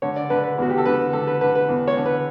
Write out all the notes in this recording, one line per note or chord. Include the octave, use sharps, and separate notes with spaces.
D3 C#5
D5
D3 B4
B4
E2 F#4
G4
A4
D3 B4
D3 A4
B4
D3 B4
B4
E2
C#5
D3
B4